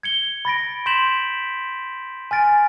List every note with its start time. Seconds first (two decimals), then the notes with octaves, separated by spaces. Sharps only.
0.03 G#6 C#7 G7
0.45 B5 A6 A#6 D7
0.86 C6 G6 B6 E7 F#7
2.31 G#5 F6 A6 D7